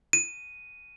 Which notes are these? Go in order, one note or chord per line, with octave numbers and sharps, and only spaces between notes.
D#7